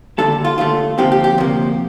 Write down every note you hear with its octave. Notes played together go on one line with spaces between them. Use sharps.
D#2 D3 A3 A4
F4
D#2 D3 A3 F4
D2 C3 F3 A#3 G4
G4
G4
D2 C3 F3 A#3